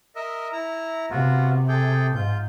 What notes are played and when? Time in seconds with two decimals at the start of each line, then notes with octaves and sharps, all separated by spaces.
0.16 A#4 D#5 E5
0.53 E4 A#5
1.11 C3 B3 F4 F#4
1.68 G#4 A4 G5
2.15 G#2 F4 G6